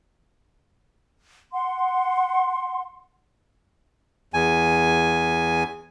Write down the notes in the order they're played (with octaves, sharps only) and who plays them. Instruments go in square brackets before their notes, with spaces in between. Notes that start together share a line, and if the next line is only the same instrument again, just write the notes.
[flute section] F#5 C6
[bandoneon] E2 G#5